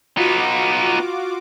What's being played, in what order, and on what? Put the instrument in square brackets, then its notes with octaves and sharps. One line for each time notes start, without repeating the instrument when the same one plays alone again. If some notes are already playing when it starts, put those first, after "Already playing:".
[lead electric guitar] B3 D#4 [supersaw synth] F4 F#4 D6